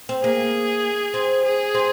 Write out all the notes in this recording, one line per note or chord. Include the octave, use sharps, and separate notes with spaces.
C4
A#3 G#4
C4
G#4
C4